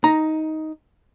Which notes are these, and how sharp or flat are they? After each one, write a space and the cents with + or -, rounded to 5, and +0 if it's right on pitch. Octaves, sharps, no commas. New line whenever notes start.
D#4 +10 A#5 +0